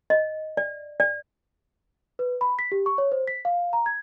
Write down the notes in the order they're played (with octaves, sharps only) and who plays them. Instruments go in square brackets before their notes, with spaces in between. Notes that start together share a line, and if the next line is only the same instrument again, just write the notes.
[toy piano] D#5
D5
D5
[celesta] B4
B5
B6
G4
C#6
C#5
C5
B6
F5
A#5
G#6